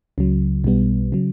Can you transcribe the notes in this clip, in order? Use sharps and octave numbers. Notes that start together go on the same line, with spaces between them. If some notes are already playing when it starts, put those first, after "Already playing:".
C#2 C#3 F#3
B1 B2 G3 B3
C#3 F#3